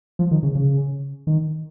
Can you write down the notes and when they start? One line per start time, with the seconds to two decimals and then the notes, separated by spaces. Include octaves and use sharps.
0.19 F3
0.31 D#3
0.43 C#3
0.55 C#3
1.27 D#3